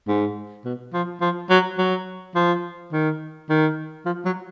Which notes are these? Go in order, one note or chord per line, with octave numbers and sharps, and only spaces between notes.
G#2
B2
F3
F3
F#3
F#3
F3
D#3
D#3
F3
F#3